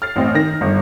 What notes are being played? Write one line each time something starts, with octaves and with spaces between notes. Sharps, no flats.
F6 A6 C7
A1 C4 D#5
D#3 A#6
G1